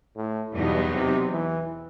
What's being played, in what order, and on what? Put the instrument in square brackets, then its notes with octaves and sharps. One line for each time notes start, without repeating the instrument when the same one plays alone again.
[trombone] A2
[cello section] E2 B2 F#3 B3 D#4 [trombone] G2
[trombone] C3
E3